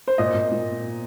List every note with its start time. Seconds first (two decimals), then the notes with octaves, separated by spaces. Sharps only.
0.08 C5
0.18 A#2 D#5
0.34 A#2
0.52 A#2